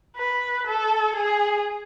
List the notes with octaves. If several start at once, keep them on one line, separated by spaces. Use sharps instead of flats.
B4
A4
G#4